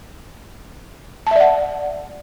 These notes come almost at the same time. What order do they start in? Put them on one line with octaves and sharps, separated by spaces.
A5 E5 D5 F#5